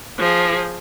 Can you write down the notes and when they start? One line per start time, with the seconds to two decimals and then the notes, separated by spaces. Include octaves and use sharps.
0.19 F3 G#4